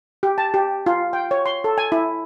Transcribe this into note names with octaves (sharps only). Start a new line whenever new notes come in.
G4
A5
G4
F4
G5
C#5
C6
A4
G#5
E4